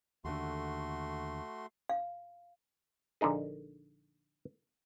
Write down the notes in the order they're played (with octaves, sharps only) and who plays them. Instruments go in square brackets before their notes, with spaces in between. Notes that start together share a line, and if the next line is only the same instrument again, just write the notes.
[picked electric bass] D#2 D3 [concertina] A3 F#4 C6
[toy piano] F5
[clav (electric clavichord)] A#1 D3 A#3 D#4 G#4